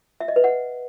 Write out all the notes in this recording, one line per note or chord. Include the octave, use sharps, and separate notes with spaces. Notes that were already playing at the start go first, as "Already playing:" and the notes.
E5
D#5
B4
F#5